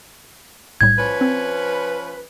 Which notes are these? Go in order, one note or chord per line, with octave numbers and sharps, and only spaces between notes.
B1 A2 G3 G#6
F3 C#4 B4
C4